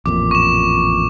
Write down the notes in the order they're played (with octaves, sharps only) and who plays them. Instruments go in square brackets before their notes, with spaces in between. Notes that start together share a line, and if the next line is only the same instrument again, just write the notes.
[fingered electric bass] A1 F2 A#2 [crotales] D6
[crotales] C#6 E7